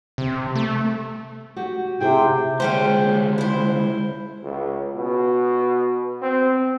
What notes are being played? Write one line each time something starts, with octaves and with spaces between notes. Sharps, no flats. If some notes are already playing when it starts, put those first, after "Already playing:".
C3
A3
F#4 G4
C3 E4 G#4 C5 G5
D2 G#3 C#4 G4 C5
E4 C5
C#2
B2
C4